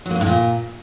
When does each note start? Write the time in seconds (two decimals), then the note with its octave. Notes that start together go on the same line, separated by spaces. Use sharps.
0.06 F#3
0.11 A#3
0.16 G2
0.21 A2
0.26 A#2